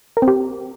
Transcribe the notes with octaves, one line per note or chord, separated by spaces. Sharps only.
A#4
C4
G4